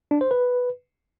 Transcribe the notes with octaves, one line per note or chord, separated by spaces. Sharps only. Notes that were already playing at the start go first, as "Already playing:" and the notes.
D4
C5
B4